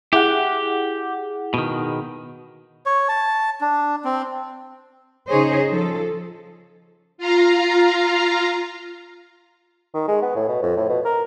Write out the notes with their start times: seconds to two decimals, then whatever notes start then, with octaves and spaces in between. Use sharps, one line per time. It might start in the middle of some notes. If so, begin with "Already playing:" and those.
0.13 E4 G4 G#4 F#5
1.54 B2 D#3
2.86 C#5
3.09 A5
3.61 D4
4.05 C4
5.29 C#3 D#4 G#4 C5 C#5 D#5
5.69 F3 A4
7.18 F4 F5 A#5
9.94 D#3
10.08 G#3
10.22 B3
10.36 A2
10.48 B2
10.63 F2
10.77 A2
10.89 B2
11.05 A#4